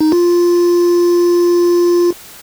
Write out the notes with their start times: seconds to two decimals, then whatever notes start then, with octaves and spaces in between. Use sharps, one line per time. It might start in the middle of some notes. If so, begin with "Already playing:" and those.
0.01 D#4
0.12 F4